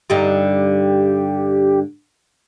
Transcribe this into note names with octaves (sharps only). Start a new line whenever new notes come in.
G2 D3 D#4 G4